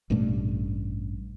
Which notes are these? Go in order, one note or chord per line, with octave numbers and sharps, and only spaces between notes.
A1 G2 B2 A3